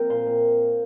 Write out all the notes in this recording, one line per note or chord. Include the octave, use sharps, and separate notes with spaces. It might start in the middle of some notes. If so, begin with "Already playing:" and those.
Already playing: F3 A#3 C4 A#4 G5
A#2 C6
A#2